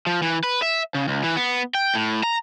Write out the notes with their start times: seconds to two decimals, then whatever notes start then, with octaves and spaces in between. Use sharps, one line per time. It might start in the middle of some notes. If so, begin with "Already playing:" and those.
0.07 F3
0.22 E3
0.44 B4
0.62 E5
0.95 C#3
1.08 C#2
1.24 E3
1.37 B3
1.75 G5
1.95 A2
2.24 A#5